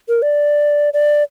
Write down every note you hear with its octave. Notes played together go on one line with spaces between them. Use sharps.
A#4
D5
D5